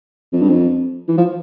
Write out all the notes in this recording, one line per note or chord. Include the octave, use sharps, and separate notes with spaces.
F2
G2
F2
E3
F3